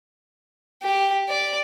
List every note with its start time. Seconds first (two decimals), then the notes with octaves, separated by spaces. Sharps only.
0.83 G4
1.29 D5